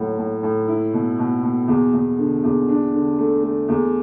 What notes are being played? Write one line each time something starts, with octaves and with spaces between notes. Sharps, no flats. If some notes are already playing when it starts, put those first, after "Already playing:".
Already playing: A2 F#3
A2
A2
E4
B2
B2
B2
E2
E2
D3
E2
D4
D3
A3
A3
E2